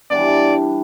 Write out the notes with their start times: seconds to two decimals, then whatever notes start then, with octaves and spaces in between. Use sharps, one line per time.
0.10 E3 G3 B3 D4 D5